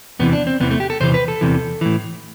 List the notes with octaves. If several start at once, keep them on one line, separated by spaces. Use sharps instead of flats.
E2 C3 E3 B3
D4
C4
E2 C3 E3 B3
A3
G4
A4
E2 C3 E3 C5
B4
A4
E2 C3 E3
A2 E3